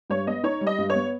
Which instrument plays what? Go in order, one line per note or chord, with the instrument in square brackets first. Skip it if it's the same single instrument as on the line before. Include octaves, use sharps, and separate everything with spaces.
[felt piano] G2 [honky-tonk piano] C#5
[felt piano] B3 [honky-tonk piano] D#5
[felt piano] D#4 [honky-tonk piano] C#5
[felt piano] G3
[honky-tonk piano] D#5
[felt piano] G2
[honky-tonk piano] C#5
[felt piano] B3